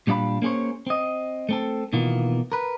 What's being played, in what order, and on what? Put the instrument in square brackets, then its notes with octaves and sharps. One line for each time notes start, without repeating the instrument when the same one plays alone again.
[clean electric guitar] A#2 G3 D4 D5 F5 B5
A#3 C#4 G#4 C5 C#5
C4 D#5
A3 C4 A4
B2 D#3 E3 A#3 B3 F4
A#4 B4